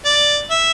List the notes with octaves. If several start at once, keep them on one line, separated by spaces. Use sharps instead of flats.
D5
E5